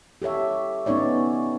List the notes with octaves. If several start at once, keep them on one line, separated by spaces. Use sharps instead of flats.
G4 A4 C#5 E5
B3 C#4 D#4 C#5 D5